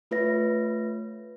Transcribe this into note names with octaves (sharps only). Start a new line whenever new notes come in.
A3 F4 B4 C#5 E5 A#6